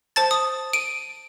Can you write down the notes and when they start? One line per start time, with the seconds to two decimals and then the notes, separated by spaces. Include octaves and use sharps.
0.16 C5 A5 A6
0.31 D#6
0.73 D7 D#7